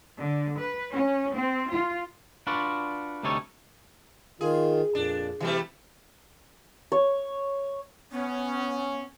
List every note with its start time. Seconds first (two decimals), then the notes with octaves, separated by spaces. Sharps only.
0.19 D3
0.60 B4
0.92 C#4
1.34 C4
1.70 F4
2.47 D4 F4 F#4 B4 D5
3.23 D2 C3 G3 D#4 A4 C#5
4.41 D#3 F4 G#4
4.95 F2 A#2 D4
5.40 C3 E3 G3 A3
6.92 C#5
8.12 B3 C#4